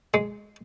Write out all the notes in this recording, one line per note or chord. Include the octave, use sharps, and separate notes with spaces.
G#3